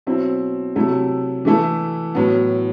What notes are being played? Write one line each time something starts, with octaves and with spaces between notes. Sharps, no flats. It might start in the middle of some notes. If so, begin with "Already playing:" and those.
B2 F#3 C4 E4
C3 F#3 A3 E4
E3 A3 E4 A4
A2 F#3 B3